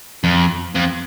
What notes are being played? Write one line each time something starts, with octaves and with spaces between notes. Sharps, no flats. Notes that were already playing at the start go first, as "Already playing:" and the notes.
F2
F2